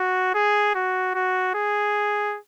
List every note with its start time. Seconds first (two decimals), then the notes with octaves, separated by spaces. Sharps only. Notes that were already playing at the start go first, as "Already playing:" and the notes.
Already playing: F#4
0.35 G#4
0.75 F#4
1.15 F#4
1.55 G#4